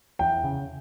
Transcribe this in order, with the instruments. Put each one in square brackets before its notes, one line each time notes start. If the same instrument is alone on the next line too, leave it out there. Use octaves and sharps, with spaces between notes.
[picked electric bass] E2 [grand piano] G5
[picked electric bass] C#3